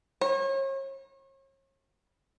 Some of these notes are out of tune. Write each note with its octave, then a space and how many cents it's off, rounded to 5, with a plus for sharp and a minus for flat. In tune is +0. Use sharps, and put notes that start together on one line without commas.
C#5 -40